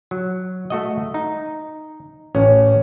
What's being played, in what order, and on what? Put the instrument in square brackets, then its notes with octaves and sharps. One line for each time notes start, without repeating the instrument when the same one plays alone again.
[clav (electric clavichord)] F#3
A3 F#4 D#5
D#4
[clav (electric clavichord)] A1 [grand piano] C#4